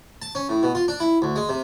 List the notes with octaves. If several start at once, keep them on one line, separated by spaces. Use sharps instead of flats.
A5
C#4
A2
B2
F4
D4
E4
D2
G#3
C3